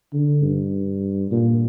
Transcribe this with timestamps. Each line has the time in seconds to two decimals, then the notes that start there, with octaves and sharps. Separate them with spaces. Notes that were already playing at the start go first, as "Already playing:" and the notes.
0.13 D3
0.43 G2
1.31 A#2